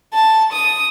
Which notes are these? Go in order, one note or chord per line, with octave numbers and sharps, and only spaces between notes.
A5
D#6